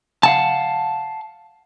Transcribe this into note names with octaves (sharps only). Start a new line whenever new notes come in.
F5 F#5 A5